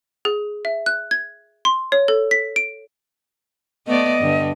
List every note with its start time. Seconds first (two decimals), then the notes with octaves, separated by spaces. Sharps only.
0.25 G#4
0.65 E5
0.86 F#6
1.11 G#6
1.65 C6
1.92 C#5
2.08 A4
2.31 B6
2.56 D7
3.87 A3 B3 D5 D#5
4.20 G2 D3